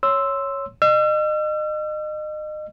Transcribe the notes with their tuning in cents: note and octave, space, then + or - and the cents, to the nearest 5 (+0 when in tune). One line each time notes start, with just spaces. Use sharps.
C#5 +0 C6 +0 E6 +0
D#5 -30 E6 +45